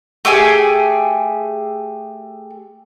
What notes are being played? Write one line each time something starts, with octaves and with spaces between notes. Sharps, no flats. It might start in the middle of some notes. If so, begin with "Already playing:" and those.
A3 G4 G#4 G#5